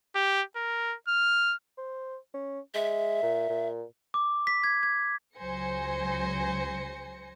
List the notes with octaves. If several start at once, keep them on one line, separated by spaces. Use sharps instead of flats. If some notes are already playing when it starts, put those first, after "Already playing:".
G4
A#4
F6
C5
C#4
G#3 E5
A#2
A#2
D6
B6
G#6
G#6
C#2 F#3 C5 G#5 A#6 C#7